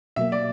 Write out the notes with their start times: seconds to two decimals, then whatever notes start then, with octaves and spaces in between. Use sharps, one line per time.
0.16 B2 F#3 A#3 E5
0.32 D5